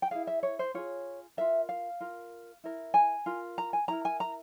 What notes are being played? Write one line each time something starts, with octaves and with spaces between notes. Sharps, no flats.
G5
E4 G#4 F5
E5
C#5
C5
F4 G#4 C#5
F4 A#4 E5
F5
F4 A#4
E4 A#4
G#5
F4 A#4
A#5
G#5
E4 A#4 A#5
G#5
A#5